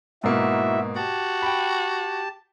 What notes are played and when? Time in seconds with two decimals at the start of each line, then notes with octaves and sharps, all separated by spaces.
0.24 G#2 B2 A#3 E4 F#4 E5
0.96 F#4 G4 A5
1.42 G5 B5